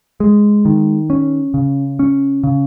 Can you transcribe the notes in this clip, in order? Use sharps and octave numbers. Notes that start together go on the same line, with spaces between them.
G#3
D#3
C#4
C#3
C#4
C#3